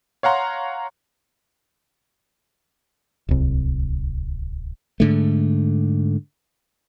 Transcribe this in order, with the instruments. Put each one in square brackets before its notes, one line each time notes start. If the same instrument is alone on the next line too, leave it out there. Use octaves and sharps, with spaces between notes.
[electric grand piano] C#5 F5 F#5 A#5 C6
[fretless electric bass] D1 C2
[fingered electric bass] G#2 D3 A3